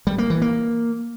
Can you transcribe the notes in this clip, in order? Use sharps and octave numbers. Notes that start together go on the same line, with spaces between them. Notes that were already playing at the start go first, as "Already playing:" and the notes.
G3
A#3
E3
A#3